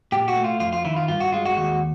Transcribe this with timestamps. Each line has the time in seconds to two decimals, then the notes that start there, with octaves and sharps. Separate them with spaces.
0.12 A#2 G4
0.28 F#4
0.36 A3
0.44 F4
0.60 F2 F4
0.73 F4
0.85 D#3 E4
0.96 F4
1.08 G2 F4
1.20 F#4
1.32 G#3 F4
1.46 F#4
1.57 D#2 F#4